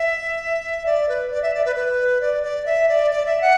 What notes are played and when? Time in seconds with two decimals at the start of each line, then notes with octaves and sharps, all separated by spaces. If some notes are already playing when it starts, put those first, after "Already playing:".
Already playing: E5
0.86 D5
1.09 B4
1.31 D5
1.42 E5
1.54 D5
1.65 B4
1.76 B4
2.21 D5
2.43 D5
2.66 E5
2.89 D5
3.11 D5
3.26 E5
3.42 F#5